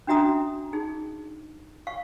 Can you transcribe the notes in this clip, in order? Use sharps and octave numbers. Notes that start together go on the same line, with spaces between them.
C#4 D4 F#4 E5 A#5 D#6
D#4 G#4
F5 C#6